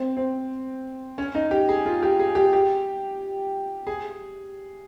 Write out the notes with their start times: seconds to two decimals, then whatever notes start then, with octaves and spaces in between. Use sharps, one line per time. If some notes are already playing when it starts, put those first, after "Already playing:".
Already playing: C4
0.17 C4
1.18 C#4
1.35 D#4
1.51 G4
1.69 G#4
1.86 F4
2.03 G4
2.20 G#4
2.35 G4
2.53 G4
3.87 G#4